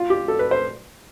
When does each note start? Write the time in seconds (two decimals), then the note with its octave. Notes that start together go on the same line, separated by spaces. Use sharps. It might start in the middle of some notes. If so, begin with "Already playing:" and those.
Already playing: F4
0.10 G4
0.28 A4
0.39 B4
0.51 C5